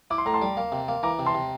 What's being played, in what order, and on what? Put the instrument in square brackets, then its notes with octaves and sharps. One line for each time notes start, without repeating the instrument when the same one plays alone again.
[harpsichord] E4 [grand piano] D6
[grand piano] C6
[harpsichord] A2 [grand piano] A#5
[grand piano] A5 C6
[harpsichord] G3
A#3
C3
A#3
[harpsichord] E3 [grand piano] A#5 D6
[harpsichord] C3
[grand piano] A5 C6
[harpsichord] C3